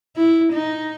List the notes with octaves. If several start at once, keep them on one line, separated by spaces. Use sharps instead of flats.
E4
D#4